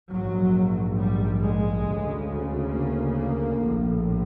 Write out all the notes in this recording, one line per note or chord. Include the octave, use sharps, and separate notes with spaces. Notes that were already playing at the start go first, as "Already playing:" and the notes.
A#1 G#2 F#3
G3
G#3
D2 C#3
A#3
A#3
A#1 A2